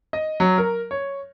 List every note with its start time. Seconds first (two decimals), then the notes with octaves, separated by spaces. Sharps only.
0.13 D#5
0.40 F#3
0.58 A#4
0.91 C#5